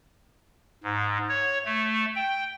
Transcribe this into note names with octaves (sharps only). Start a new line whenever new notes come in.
G#2
C#5
A3
G5